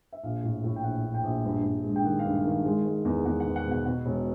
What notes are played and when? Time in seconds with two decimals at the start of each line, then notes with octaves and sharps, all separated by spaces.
0.12 E5
0.23 A#1 F5
0.43 A2
0.64 A2
0.76 G5
0.83 A#1 F#5
1.04 A#1
1.14 G5
1.24 A#1
1.44 G2
1.64 G2
1.84 G#3
1.96 G5
2.04 D#3 F#5
2.19 F5
2.25 G2
2.35 F5
2.45 D#3
2.50 F5
2.65 G#3
2.86 G#3
3.05 E2
3.25 E2 F#5
3.40 E2 F#5
3.56 F#5
3.66 B2
3.71 F#5
3.86 B2 F#5
4.06 E1